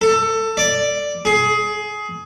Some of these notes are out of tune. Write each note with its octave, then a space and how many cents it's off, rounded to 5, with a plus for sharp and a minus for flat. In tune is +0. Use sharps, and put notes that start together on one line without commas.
A4 +20
D5 +0
G#4 +20